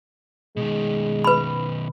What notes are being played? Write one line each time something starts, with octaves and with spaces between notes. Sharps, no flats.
B2 D#3 G#3
B4 B5